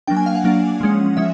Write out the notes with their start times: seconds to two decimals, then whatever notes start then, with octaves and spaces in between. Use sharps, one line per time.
0.07 F#3 A#3 D4 G5
0.17 G#5
0.26 F5
0.35 F#5
0.44 F#3 A#3 D4
0.81 F3 G#3 C#4
1.17 F3 G#3 C#4 E5